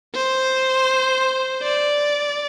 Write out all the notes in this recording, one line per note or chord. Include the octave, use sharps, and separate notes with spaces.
C5
D5